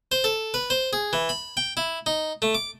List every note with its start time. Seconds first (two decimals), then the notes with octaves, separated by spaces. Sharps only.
0.12 C5
0.24 A4
0.54 B4
0.70 C5
0.93 G#4
1.13 E3
1.29 B5
1.57 G5
1.77 E4
2.06 D#4
2.42 A3
2.55 D6